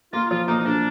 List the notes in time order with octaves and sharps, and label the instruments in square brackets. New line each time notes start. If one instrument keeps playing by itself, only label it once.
[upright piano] A#3 [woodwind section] F4
[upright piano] F3 [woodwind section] F4
[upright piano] A#3 [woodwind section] D#4
[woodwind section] D#4
[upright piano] A#3 [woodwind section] D4